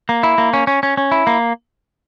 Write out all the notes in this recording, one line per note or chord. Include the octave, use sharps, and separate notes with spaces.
A#3
E4
A#3
C#4
C#4
C#4
C#4
E4
A#3